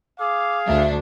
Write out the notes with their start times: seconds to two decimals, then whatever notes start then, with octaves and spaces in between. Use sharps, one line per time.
0.19 G#4 F5 D6
0.67 D2 D4 E5